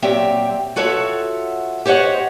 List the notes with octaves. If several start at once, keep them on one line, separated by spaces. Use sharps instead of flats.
A#2 F#3 C4 G4 E5 G5
F4 F#4 A4 C#5 E5 F#5
G4 C5 C#5 D#5 F#5